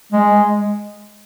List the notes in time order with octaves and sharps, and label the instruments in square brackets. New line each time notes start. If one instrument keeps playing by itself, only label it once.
[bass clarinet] G#3